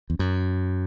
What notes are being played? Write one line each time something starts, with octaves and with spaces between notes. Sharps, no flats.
E2
F#2